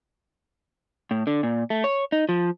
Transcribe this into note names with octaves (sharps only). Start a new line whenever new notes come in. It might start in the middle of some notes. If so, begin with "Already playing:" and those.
A2
D3
A#2
A3
C#5
D#4
F3